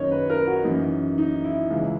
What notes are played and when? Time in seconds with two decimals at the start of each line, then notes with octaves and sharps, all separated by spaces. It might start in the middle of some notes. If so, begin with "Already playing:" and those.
Already playing: F#2 D#3 C#5 D#5
0.11 B4
0.30 A#4
0.47 F#4
0.64 F#2 E3 D#4
1.18 D#4
1.44 E4
1.70 C#2 C#3 E3